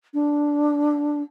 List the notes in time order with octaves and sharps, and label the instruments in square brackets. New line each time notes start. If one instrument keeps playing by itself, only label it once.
[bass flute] D4